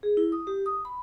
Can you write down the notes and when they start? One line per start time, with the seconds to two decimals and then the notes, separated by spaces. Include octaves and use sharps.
0.03 G#4
0.17 E4
0.32 D#6
0.47 G4
0.66 D#6
0.85 B5